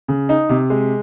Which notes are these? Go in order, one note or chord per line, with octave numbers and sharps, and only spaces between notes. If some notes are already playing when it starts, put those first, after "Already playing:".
C#3
D#4
C3
G#3